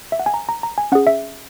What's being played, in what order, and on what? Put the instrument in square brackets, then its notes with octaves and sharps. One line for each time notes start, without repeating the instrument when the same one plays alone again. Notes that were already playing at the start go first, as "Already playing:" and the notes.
[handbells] E5
F#5
G#5
A#5
A#5
A#5
G#5
C#4 G#4 F#5
E5